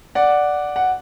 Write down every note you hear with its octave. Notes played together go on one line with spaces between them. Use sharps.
D5 F#5
F#5